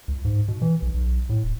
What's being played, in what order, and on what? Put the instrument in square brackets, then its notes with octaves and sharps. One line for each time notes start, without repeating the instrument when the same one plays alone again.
[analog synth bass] C#2
G#2
B2
E3
B1
B1
A2
D1